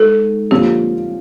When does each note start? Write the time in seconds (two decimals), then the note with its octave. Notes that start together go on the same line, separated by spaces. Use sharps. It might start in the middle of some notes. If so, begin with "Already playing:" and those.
Already playing: G#2 A4
0.51 D3 F3 A#3 C#4 G4